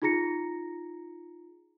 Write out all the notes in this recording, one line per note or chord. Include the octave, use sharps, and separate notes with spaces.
D#4 F4 G#4 A#5 A#6 C#7